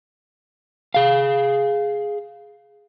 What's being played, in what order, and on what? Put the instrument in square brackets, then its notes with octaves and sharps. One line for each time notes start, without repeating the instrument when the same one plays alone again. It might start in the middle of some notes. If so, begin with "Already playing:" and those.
[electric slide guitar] G#4 F5